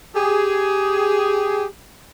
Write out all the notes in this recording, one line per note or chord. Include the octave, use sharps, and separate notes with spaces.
G4 G#4